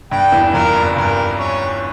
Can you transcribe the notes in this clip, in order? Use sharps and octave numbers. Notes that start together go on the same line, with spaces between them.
G2 G5
E2 E3
F2 F3 A#4
G2
G2 A#4
C#4